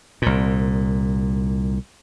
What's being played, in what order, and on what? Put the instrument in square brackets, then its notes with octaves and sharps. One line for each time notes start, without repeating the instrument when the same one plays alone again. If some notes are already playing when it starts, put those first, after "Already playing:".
[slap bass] C2 A#2